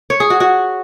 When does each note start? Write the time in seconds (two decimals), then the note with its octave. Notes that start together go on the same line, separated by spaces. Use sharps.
0.10 C#5
0.20 G#4
0.30 F#4
0.40 F#4